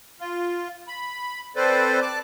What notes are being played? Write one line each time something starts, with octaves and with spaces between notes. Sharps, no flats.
F4
B5
C4 A4 B4 C5 D5
D5 A5 D6